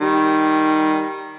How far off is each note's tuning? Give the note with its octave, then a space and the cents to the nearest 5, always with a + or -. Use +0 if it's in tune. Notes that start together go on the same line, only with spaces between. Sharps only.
D#3 +0 G3 +0